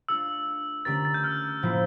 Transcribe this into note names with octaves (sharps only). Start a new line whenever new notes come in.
A3 D4 F4 A4 E6
D3 A3 C#4 G4 A#4 A6
A6
G6
F6
A2 F3 A#3 E4